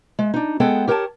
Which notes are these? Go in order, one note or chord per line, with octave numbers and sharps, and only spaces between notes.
G#3
D4 D#4
G#3 B3 G#4 A4 F#5 G5
G4 A#4 C#5 G5 A5